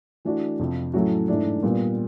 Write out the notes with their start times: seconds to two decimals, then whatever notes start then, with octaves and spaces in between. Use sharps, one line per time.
0.25 E3 A3 D4 F#4
0.59 F2 C3 F3
0.94 A2 F#3 A3 C#4 F#4
1.28 G#2 E3 A3 D4
1.63 A#2 G3 B3